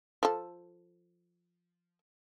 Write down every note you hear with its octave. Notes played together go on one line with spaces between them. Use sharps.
F3 A4